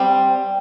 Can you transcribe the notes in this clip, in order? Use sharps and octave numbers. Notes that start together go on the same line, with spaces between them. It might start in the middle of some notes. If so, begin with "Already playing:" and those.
Already playing: G3 C4